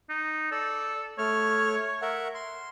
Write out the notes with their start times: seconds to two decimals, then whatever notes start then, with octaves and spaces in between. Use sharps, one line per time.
0.10 D#4
0.52 A4 D5
1.18 A3 C#5 F6
2.02 A#4 E5 F#5
2.34 C6